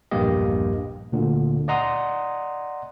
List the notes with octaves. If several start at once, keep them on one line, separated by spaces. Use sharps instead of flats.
A#1 E2 G2 A#3 G4 D#5
D2 A#2 D3
D5 D#5 F#5 A#5 C6 D#6